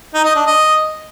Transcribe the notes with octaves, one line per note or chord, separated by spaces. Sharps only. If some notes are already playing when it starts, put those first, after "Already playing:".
D#4
D#5
D4
D#5